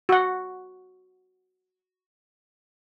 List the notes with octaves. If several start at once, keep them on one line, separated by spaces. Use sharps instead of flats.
F#4 F#5